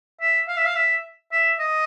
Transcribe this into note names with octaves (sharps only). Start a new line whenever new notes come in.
E5
F5
E5
F5
E5
E5
D#5